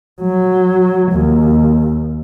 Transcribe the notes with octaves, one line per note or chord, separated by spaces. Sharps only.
F#3
D#2